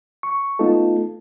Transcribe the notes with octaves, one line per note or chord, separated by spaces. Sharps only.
C#6
A3 B3 D#4 F4 A4